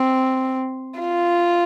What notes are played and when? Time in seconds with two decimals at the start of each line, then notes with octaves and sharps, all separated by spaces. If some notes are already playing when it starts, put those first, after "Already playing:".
Already playing: C4
1.00 F4